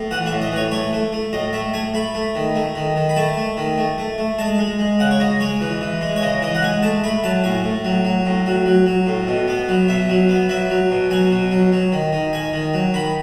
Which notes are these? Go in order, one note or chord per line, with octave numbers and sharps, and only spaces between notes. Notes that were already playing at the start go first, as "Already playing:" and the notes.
Already playing: A2
E3 F#5
E5
A2
D#5
E3 C#5
A3 C#5
A3
A3
A2 D#5
A3 E5
A3 G#5
A3 B5
A3
D#3
A3
D#3
D#3
B5
A3 A5
A3
D#3
A3
A3
A3
G#3 A5
G#3
G#3
C#3 F#5
C#5
C#3 D#5
G#3 C#5
E3
E3
G#3
C#5
C#3 D#5
E3 D#5
F#5
G#3 G#5
A3 A5
A3 B5
F#3 A5
A2 G#5
A2
F#3
F#3
A2
F#3
F#3
F#3
A2
B2
B3
F#3
B2 E5
F#3
B3
F#3 E5
F#3
B2
F#3 G#5
B2
F#3
F#3
D#3
D#3
D#3 G#5
D#3
F#3
D#3 B5